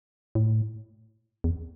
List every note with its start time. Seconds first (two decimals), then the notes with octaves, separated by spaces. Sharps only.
0.35 A2
1.44 E2